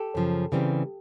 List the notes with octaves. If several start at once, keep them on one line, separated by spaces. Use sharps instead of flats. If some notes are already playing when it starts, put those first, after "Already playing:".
Already playing: G4 A4
F#2 C#3 F3
C#3 E3 G3 C4